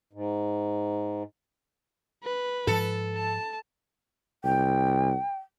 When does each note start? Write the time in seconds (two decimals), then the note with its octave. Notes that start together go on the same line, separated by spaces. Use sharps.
0.13 G#2
2.23 B4
2.67 G#2 F3 A4
3.15 A5
4.44 C2 G5